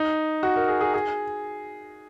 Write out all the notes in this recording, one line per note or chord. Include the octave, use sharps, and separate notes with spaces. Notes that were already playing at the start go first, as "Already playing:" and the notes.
Already playing: D#4
F#4
A#4
G#4
G#4
G#4